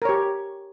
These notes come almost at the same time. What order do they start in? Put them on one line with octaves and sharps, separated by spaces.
A#4 C#5 G4